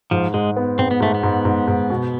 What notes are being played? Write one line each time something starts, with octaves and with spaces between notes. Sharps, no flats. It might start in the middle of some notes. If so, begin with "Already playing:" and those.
G#2 F3
G#2 G#3
B3
G#2 C4
B3
G#2 A3
B3
G#2
G#2
G#2
B2